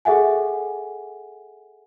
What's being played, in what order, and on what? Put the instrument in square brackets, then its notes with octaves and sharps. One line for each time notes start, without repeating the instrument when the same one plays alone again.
[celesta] G#4 A4 E5 F#5 G#5